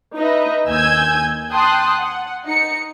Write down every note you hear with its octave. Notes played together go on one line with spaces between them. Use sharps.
D#4 B4 D#5 E5
D#2 G#5 E6 G6 G#6
G5 A5 C6 D#6 F#6
F#5
D#4 C#7